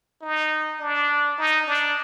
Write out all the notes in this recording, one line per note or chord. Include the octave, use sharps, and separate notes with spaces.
D#4
D4
D#4
D4